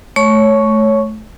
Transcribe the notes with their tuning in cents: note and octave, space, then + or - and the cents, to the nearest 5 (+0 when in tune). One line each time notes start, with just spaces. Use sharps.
A3 -25 C#5 +0 C#6 +5